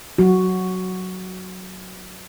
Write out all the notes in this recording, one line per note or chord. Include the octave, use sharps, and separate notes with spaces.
F#3 F#4